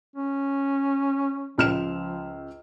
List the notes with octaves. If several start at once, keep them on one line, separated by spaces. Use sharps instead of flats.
C#4
C#2 F3 F6 E7